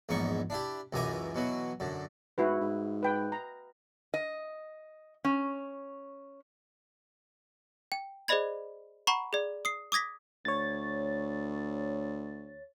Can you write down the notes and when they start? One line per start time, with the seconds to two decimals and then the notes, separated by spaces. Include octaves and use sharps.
0.09 A#1 E2 G#2 D#4 C#6
0.50 D4 E4 G4
0.93 C#2 F#2 E3 G#5 A#5 D6
1.35 B2 E3 F#3
1.80 F#2 D3
2.38 G#2 E4 F#4 B4
2.60 G#2
3.03 B4 G5
3.32 A#5
4.14 D#5
5.25 C#4
7.92 G5
8.28 G#4 C5 D5 D#5 B5 G#6
9.07 F#5 A#5 B5 C#6
9.33 G#4 D5
9.65 D#6 C7
9.92 D6 D#6 G#6 A#6 B6
10.45 D2 C#5 A6